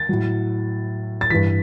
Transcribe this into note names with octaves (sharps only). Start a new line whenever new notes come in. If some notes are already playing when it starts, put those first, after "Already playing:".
Already playing: A6
A2 F#3
A6
G2 E3 B6